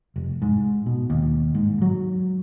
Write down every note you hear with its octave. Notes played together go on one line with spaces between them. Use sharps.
F1
G#2
B2
D#2
G#2
F#3